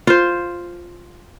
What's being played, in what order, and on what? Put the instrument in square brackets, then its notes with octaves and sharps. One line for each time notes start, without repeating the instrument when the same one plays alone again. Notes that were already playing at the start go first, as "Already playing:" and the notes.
[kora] F4 C5